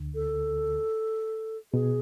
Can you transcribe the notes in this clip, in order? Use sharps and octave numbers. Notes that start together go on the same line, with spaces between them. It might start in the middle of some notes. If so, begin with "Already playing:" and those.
Already playing: D2 D3
A4
B2 G#4